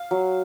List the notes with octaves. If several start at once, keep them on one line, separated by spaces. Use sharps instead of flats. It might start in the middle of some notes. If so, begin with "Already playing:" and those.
Already playing: F5
F#3